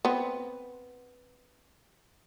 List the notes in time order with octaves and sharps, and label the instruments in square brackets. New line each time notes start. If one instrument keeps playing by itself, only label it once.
[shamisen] B3 C4